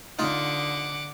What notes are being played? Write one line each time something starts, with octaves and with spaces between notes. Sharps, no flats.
D3 D#4 F4 F#5 D6